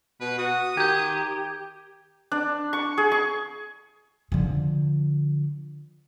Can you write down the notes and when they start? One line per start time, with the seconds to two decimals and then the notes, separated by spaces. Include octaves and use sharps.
0.21 B2 B4
0.38 F#4 D#6
0.77 D#3 G4 G6 G#6
2.32 D4
2.73 C#6
2.98 G#4
3.12 C#6
4.32 D3 F3